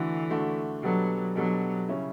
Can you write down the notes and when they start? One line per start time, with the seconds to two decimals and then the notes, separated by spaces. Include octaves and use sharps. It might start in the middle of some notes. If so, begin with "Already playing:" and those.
Already playing: D3 E3 A3 D4 F#4
0.30 D3 A3 D4 F#4
0.83 B2 F#3 G3 B3 D4 A4
1.35 B2 F#3 G3 B3 D4 A4
1.88 C#3 G3 C#4 E4